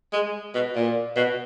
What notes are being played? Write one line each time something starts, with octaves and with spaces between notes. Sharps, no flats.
G#3
B2
A#2
B2